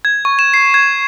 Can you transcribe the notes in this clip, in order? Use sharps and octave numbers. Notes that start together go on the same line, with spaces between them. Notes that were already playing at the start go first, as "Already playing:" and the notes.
G#6
C#6
E7
C7
G#6